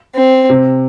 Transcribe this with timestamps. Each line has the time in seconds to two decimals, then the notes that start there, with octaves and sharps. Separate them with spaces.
0.16 C4
0.50 C3